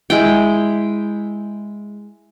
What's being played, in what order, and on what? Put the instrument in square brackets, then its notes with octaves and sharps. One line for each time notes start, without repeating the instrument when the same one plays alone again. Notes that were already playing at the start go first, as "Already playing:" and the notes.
[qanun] G#3 E4 G5